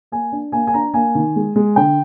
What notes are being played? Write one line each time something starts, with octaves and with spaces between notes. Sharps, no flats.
A#3 G#5
D4
A#3 G#5
G#5
D4 A#5
A#3 G#5
D#3
G#3
G#3
D3 G5